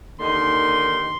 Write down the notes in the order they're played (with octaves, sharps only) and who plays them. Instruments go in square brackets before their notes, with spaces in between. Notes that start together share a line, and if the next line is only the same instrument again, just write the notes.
[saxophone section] D#2 D3 D#3 [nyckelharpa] C6